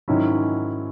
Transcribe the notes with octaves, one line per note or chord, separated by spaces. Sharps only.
G#2 D#3 F#3 C#4 E4